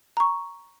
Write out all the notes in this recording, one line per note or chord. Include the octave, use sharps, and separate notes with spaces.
A#5 C#6